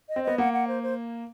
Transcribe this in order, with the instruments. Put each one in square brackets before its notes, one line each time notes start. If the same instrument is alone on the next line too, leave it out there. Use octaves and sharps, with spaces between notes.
[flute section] D#5
[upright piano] C4
[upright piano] B3 [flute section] D#5
[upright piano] A#3 [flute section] F#5
[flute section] F#5
C5
C5